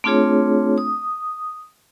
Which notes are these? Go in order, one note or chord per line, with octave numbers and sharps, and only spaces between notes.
A3 C4 D4 F4 G#4 C#5
D#6